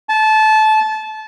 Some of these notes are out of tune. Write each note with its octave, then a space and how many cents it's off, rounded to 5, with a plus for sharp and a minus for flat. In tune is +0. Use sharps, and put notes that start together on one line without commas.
A5 -20